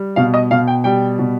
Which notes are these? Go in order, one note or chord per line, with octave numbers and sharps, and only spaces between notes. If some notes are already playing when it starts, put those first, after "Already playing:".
Already playing: G3
B2 F5
D#5
B2 F5
G5
G3 G5
B2